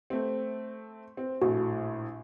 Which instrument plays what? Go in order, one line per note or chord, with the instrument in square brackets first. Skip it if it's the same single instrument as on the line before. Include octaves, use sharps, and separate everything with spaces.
[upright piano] A3 C4
C4
[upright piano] A#1 A2 A3 [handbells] F#4